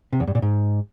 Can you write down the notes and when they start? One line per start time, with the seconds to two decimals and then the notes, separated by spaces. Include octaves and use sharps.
0.13 C3
0.20 E2
0.27 G2
0.35 A#2
0.42 G#2